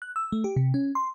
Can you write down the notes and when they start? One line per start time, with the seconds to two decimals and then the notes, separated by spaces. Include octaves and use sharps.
0.02 F#6
0.16 E6
0.32 A3
0.44 G4
0.56 C3
0.74 C#4
0.95 C6